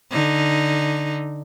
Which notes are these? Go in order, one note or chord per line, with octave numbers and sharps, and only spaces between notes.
D3 D#4